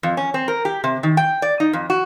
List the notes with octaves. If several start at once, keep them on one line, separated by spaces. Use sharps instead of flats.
F2
C#4
C4
A#4
G4
C3
D#3
G5
D5
D#4
F2
F#4